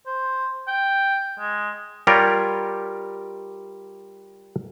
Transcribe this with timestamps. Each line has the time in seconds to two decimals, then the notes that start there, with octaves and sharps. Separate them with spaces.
0.07 C5
0.67 G5
1.39 G#3
2.07 G3 F4 G4 A#4 C#5 D5